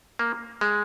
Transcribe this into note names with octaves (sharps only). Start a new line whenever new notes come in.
A#3
G#3